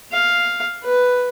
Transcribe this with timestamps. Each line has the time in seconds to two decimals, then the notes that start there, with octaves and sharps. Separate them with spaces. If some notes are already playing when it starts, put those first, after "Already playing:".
0.12 F5
0.83 B4